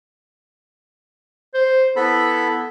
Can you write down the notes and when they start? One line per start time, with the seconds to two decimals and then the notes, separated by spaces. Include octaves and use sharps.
1.54 C5
1.96 B3 E4 A4 B5